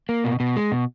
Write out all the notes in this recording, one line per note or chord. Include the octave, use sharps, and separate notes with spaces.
A#3
B2
B2
G#3
B2